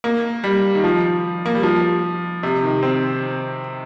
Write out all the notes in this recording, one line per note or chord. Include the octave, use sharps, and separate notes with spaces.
A#3
G3
D#3
F3
A#3
G3
F3
C3
D#3
C4